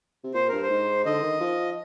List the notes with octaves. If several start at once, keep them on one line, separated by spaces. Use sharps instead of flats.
C3
A#2 C5
G2 A#4
C5
G#2
D3 D#5
D#3
F3